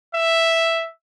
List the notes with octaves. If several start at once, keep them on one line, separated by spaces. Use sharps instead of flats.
E5